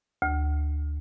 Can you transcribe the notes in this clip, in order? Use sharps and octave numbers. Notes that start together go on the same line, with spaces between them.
D2